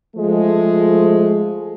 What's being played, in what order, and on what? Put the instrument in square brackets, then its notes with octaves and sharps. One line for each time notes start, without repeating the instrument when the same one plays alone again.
[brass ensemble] F3 G#3 A3